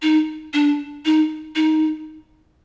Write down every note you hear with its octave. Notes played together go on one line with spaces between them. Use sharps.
D#4
D4
D#4
D#4